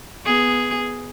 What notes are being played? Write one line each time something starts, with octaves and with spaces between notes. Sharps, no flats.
B3 G#4